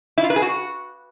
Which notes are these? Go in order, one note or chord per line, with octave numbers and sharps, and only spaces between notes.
E4
F4
B4
G#4
F#4